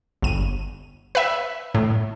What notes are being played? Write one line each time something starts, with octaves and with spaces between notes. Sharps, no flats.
G1 D#7
B4 E5
A2